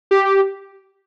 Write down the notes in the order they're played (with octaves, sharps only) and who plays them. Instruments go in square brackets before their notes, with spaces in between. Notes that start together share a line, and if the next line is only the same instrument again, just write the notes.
[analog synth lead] G4